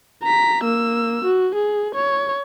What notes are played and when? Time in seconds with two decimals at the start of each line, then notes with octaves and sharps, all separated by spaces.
0.23 A#5 B6
0.63 A#3 E6
1.24 F#4
1.55 G#4
1.95 C#5